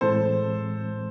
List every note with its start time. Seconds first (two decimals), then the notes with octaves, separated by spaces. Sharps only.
0.01 A2 E3 G#3 C4 A4 C5